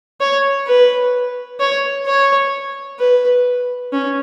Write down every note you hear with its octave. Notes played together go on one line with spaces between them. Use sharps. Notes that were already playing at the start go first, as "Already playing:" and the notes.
C#5
B4
C#5
C#5
B4
C#4